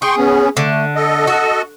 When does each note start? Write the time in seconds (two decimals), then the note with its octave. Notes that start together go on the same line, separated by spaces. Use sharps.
0.02 G#4 G5 C6 C#6
0.17 B3 C#4
0.57 D3 A3
0.96 A4 D#5
1.27 F#4